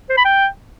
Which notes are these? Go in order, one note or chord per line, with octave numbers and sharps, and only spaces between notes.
C5
B5
G5